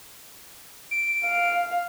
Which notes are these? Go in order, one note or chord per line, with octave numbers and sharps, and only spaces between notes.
D7
F5